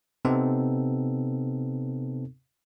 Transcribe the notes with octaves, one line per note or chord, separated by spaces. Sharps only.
C3 B3 C4 D#4 A4